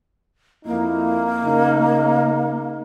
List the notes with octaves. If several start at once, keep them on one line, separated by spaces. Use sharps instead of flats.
F2 A#3 D#4 E4
C#3 D#4